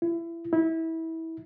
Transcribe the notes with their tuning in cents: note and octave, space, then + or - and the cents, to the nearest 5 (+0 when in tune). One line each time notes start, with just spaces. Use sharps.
E4 +25
E4 -25